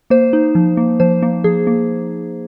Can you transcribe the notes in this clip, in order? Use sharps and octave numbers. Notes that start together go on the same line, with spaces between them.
A#3 C5
D#4
F3
A#3
F3 C5
A#3
F3 G#4
A#3